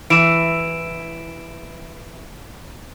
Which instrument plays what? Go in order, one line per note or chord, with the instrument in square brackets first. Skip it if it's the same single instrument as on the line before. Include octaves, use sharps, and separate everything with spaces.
[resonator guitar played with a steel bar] E3 [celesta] D7 E7